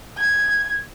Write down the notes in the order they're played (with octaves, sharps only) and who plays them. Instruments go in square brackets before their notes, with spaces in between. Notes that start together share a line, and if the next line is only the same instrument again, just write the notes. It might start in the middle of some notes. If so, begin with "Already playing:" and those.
[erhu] G#6